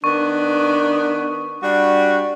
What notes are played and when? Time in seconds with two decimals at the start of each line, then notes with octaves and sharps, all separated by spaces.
0.04 D#3 B3 D4 C#6
1.62 G3 D4 F#4